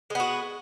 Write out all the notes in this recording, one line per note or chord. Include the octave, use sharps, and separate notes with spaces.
G#3 B3 F#4